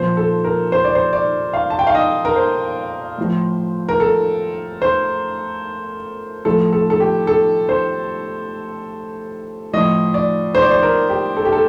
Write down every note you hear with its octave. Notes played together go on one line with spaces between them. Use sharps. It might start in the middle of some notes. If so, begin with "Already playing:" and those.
Already playing: A#2 F3 C5
A4
A#4
C5
D5
C5
D5
F5
A5
G5
F5
D#5
A#4
C5
A2 F3
A#4
A4
C5
A2 F3 A4
A4
A4
G4
A4
C5
A2 F3 D#5
D5
C5
D5
C5
A#4
G4
A4
G4
A4